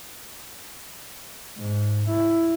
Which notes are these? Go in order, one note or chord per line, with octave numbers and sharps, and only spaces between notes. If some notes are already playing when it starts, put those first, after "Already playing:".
G#2
E4